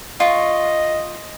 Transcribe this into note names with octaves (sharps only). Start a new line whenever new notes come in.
F4 D#5 C#6